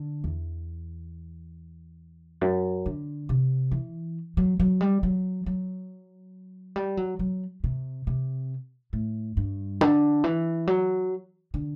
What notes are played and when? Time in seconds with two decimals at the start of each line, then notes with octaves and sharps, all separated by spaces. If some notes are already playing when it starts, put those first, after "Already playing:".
Already playing: D3
0.24 E2
2.41 F#2
2.86 D3
3.29 C3
3.71 E3
4.37 F#3
4.60 F#3
4.81 G3
5.03 F#3
5.46 F#3
6.76 G3
6.97 F#3
7.19 F#3
7.64 C3
8.07 C3
8.93 A2
9.37 G2
9.81 D3
10.24 E3
10.67 F#3
11.54 D3